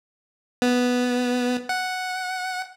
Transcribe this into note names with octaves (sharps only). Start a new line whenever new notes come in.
B3
F#5